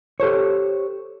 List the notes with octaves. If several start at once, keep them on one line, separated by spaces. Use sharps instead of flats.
G4 A4 C5 C#5